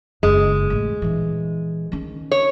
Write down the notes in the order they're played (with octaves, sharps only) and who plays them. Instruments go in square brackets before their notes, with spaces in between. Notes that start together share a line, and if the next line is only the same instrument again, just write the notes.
[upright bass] F#1 [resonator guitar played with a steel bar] G#3
[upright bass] A1 C4
A#1 E3
D#3 C#4
[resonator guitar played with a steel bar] C#5